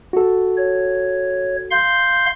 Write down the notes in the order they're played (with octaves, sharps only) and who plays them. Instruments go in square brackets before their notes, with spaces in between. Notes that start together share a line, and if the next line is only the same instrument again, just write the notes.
[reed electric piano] F#4 A4
[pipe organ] C#5
F5 C6 G6